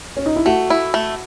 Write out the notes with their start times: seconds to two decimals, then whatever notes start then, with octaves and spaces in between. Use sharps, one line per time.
0.17 C#4
0.26 D#4
0.36 E4
0.46 A3 F#4
0.70 E4
0.94 A3